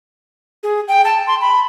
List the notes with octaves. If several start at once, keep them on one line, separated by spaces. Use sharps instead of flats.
G#4
G5
A5
C6
B5